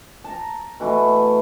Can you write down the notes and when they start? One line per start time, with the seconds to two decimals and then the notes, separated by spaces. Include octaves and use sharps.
0.24 A5 A#5
0.80 B2 E3 A3 E4